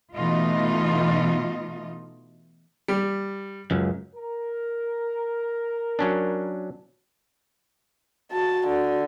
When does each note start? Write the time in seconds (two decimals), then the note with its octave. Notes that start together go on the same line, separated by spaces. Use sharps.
0.14 B2 E3 A3 D#4 F4 D#5
2.88 G3
3.71 C#2 F#2
4.15 A#4
5.99 F#3 C#4 D4
8.32 F#4 A5
8.67 D3